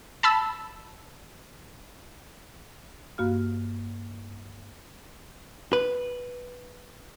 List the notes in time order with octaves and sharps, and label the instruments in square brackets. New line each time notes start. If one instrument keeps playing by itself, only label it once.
[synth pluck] A5 B5 E6
[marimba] G2 A#3 F#4 F5 F6
[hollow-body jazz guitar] B4